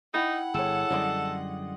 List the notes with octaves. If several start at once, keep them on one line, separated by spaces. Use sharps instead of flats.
D#4 E4 F#5 G5 B5
G1 G#4 A4 C#5
F#2 D3 G3 D5 D#5 C6